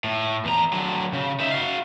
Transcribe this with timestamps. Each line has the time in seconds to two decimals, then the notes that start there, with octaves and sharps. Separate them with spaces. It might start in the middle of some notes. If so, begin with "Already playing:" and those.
0.04 A2
0.45 E2 A#5
0.73 D3 F#3
1.13 C#3
1.40 D#4 E5
1.51 F#4 F5